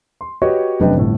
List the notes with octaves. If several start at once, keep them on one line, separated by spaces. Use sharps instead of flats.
C6
F#4 G4 B4 C#5 D#5
F1 F#2 D4 B4 D#5 G5
G1 A2